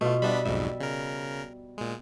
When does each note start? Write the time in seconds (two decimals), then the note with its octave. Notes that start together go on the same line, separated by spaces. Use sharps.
0.01 B2 A3 F4
0.22 G3 B3 D4 E5 B5
0.45 B1 F2 G#2 E5
0.80 C#3 A#4
1.78 A#2 G#3